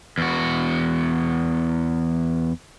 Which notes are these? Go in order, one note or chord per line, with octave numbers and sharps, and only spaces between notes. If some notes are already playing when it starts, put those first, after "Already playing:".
E2 F#4